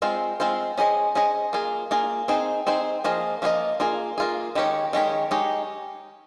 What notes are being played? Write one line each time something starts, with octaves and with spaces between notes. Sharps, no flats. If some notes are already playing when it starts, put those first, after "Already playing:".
G#3 C4 F4 C5
G#3 C4 F4 C5
C#4 G#4 C5 D#5
C#4 G#4 C5 D#5
A#3 F4 G#4
A#3 F4 G#4
C4 D#4 G#4 C5
C4 D#4 G#4 C5
F3 A#3 F4 G#4 D#5
F3 A#3 F4 G#4 D#5
A#3 F4 G#4
A#3 F4 G#4
D#3 G#3 C#4 G4 C#5
D#3 G#3 C#4 G4 C#5
G#3 D#4 G4 C#5